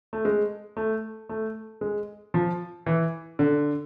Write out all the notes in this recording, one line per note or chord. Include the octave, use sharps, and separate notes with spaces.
A3
G#3
A3
A3
G#3
F3
E3
D3